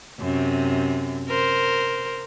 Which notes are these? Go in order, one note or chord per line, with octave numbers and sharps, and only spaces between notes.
F#2 C3
A#4 C5